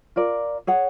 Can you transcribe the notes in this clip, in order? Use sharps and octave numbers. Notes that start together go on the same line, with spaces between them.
F4 A#4 D5
G#4 C#5 F#5